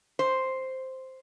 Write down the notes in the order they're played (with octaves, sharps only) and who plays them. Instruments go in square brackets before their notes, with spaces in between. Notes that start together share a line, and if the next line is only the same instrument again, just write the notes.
[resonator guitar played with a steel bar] C5